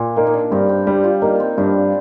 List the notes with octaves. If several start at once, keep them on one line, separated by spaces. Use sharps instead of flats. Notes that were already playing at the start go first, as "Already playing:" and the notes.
Already playing: A#2
A#3 D#4
D#4
D4
G2 C4
C4
G3 D4
F4
A#3 D#4
C4
G2 D4